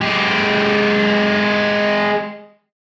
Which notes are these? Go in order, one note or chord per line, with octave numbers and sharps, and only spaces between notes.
G#3 G4